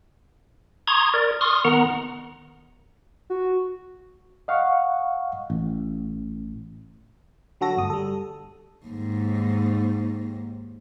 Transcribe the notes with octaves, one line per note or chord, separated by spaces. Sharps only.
A#5 C6 C#6 D#6 G#6
A#4 D5
C6 C#6 D#6 F6
D#3 B3 F#5 A#5
F#4
D#5 F5 F#5 C#6
A1
D3 F#3 F#4 A4 A#6
G1 D2 D#6
G3 A4
D#2 G#2